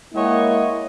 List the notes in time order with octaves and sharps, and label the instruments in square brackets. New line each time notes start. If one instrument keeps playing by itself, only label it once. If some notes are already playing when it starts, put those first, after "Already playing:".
[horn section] G#3 A#3 E4 C#5 D#5 F#5